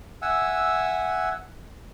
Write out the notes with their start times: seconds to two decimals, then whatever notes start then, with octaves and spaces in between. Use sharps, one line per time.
0.22 E5 F#5 G#5 E6